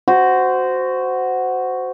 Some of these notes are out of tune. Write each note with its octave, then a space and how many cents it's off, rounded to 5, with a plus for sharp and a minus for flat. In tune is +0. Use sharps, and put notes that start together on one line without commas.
F#4 +0 C5 -15